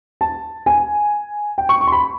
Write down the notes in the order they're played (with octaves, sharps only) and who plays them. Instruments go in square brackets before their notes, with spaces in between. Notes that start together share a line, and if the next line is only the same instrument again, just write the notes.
[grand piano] A5
G#5
G5
C#6
C#6
C6
B5